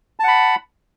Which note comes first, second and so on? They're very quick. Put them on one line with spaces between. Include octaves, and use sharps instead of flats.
A5 F#5 B5